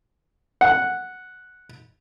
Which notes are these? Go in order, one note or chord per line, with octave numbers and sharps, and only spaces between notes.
F#5